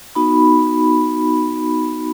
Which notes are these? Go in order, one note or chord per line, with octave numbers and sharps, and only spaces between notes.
B3 D#4 F#4 B5